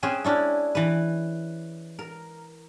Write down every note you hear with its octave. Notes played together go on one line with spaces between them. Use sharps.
C4 C#4 G#4 B4
C#4 D4 E4
E3 B4
A#4